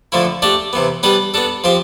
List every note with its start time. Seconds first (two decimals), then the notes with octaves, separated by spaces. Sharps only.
0.12 D3 F3 A3 E4
0.42 A3 D4 G4 D5
0.73 C3 E3 B3
1.03 G3 B3 D4 G4 B4
1.34 B3 D4 A4
1.64 F3 C4 G4